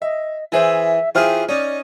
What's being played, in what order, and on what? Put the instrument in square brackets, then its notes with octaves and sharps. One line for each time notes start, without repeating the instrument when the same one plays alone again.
[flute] D#5 [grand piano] E5
[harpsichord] E3 [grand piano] E4 G#4 C5 [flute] E5
[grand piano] E3 C5 F6 [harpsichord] F4 G4 G#4 [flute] E5
[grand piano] C#4 [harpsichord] D#4 [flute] D5